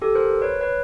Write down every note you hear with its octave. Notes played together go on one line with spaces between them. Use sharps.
G4 A4
A#4 C5
B4 C#5
B4 C#5